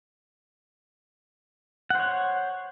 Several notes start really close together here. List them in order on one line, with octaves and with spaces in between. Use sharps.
F#5 C5 C#5